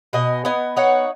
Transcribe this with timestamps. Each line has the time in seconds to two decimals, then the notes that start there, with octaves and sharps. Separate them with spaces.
0.13 B2 D#5 G#5
0.45 B3 D#5 G#5
0.76 D#4 C#5 F#5